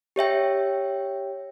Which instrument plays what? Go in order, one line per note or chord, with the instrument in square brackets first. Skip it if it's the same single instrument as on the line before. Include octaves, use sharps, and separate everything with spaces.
[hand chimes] G4 C#5 E5 G5